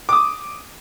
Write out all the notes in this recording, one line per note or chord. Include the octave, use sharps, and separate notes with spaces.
D6 D#6